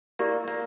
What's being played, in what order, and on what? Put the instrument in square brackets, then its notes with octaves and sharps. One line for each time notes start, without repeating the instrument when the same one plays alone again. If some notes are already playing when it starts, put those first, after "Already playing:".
[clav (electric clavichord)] A#3 [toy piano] E4 G4 A#4 D5
[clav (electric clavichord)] A#3